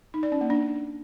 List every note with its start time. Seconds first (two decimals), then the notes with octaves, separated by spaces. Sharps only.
0.14 D#4
0.23 D5
0.32 C#4
0.41 A#3
0.50 D4